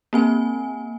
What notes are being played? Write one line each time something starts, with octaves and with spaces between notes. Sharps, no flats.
A#3 C4 G#5